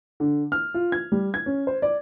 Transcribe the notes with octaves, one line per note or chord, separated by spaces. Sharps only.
D3
F6
F4
G#6
G3
G#6
C#4
C5
D5